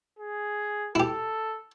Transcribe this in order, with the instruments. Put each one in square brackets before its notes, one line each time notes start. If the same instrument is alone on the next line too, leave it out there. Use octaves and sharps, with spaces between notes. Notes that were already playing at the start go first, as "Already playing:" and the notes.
[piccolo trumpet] G#4
[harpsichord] E4 G4 [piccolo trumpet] A4